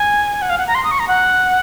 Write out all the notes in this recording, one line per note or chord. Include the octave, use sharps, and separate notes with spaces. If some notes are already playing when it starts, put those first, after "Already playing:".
Already playing: G#5
F#5
F5
F#5
A#5
C6
D#6
C#6
A#5
F#5